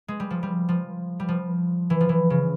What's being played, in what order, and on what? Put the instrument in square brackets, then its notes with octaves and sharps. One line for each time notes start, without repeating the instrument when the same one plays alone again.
[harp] G#3
G3
F3
G3
F3
G3
F3
E3
F3
E3
C#3